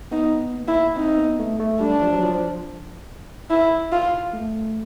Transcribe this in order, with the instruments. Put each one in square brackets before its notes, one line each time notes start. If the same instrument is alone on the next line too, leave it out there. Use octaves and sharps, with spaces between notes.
[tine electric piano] B3 [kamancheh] D#4
[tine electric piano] A#3
[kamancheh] E4
[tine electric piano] C4 [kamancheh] D#4
[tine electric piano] B3
A3
A3
[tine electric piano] G3 [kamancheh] D4
[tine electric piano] F3
F#3
F3
[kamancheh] E4
F4
[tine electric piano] A3